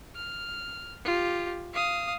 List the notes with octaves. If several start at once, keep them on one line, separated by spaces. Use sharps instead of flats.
F6
F4 G4
F5 D#6